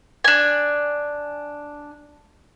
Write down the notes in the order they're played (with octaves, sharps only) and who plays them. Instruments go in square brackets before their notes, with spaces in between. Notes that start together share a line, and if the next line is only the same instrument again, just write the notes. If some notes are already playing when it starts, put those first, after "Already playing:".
[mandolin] D4 G#5